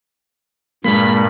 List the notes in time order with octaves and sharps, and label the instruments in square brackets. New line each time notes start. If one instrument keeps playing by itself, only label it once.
[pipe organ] G2 A#2 [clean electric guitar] G#3 A#3 [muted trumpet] B5